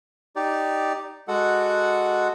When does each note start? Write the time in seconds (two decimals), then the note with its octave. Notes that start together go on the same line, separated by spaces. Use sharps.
0.36 D#4 G4 D5
1.28 G#3 F#4 A4 F#5